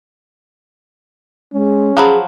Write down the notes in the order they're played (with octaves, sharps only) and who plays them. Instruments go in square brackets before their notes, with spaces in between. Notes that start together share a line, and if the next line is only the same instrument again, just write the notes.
[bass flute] G#3 [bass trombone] C#4
[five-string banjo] F3 F#3 B5 [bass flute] G#4